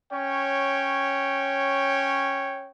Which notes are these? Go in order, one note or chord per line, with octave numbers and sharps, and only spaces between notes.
C#4 C#5 G5